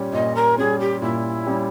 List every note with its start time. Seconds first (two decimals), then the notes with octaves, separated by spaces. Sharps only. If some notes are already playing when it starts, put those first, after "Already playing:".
Already playing: A#2 G3 C#4
0.13 A#2 D#5
0.35 A#4
0.58 G3 C#4 G#4
0.80 G4
1.02 A#2 E4
1.47 G3 C#4